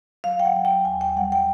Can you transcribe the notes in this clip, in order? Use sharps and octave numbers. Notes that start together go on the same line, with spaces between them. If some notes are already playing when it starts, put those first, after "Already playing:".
F#3 F5
G5
F#5
F#3
G5
D#2 G#5
G5
G3 F#5
G5